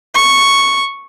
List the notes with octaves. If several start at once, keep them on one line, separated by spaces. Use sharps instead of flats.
C#6